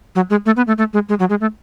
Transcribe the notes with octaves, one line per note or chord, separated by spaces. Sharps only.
F#3
G#3
A3
B3
A3
A3
G#3
G#3
F#3
G#3
A3